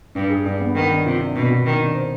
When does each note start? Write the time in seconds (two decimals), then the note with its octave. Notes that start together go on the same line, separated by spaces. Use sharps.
0.15 G2 D4
0.30 G#4
0.46 G2 D4
0.61 B3
0.75 D#3 B3
0.91 D4
1.06 C3 F4
1.20 D4
1.35 B2 D4
1.51 B3
1.65 D#3 D4
1.80 D4
1.95 C5